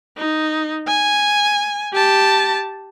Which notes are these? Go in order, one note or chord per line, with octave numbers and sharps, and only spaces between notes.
D#4
G#5
G4 A5